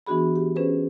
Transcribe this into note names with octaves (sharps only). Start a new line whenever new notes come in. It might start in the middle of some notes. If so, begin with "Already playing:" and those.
E3 B3 D4 F#4 G#4 B5
G4
C#4 G#4 B4 C5